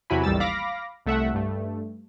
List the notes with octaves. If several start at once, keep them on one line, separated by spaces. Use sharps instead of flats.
E2 C3 F#3 E4 G#5 B5
A1 D#2 G3 E6 A6
F5 B5 D6 A#6
C2 A3 E5 F#5
G2 A3